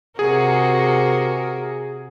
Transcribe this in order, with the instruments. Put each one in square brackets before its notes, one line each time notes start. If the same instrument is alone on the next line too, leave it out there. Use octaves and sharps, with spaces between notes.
[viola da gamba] C3 F#4 A#4 [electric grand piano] G#4